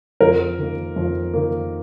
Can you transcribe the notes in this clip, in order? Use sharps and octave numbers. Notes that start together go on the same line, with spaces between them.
F2 A#4
D#3 A#3
F2
D#3 A#3